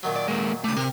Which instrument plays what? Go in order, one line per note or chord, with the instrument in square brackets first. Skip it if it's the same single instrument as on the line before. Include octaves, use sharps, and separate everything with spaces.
[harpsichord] A#2 D#3 F#3
[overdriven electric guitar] D5
G#3 A#3
[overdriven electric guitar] C#2 A3 [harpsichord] D5 D#6
[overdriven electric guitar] C3 [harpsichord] A#4 A#5